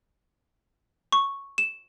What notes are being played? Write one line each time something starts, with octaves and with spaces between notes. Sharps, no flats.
C#6
E7